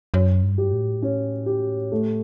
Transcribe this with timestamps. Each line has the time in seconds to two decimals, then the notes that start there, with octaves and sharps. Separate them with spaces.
0.14 F#2 C#5
0.43 G2
0.58 G4
0.73 A2
1.02 C#4
1.46 G4
1.92 A3